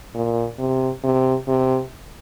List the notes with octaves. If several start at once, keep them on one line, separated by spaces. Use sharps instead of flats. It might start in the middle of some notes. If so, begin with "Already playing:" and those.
A#2
C3
C3
C3